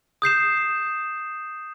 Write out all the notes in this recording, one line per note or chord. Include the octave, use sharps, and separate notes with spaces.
D#6 G6 C7 E7